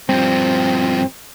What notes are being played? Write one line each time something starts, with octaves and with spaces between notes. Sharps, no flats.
G2 F3 C4